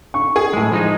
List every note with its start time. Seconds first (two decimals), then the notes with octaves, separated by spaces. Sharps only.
0.14 C#6
0.36 G#4
0.53 A2 G#3
0.71 F3 G#3 D#4